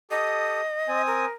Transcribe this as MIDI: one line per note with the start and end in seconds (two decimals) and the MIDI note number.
0.11 0.61 67
0.11 0.61 69
0.11 1.02 75
0.11 0.61 87
0.88 1.25 60
0.88 1.25 80
0.88 1.25 87
1.07 1.32 70